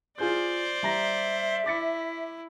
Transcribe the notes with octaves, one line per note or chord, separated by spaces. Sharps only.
F4 G#4 C5 D5 G6
G3 E5 A#5 A#6
E4 D6 A6 C#7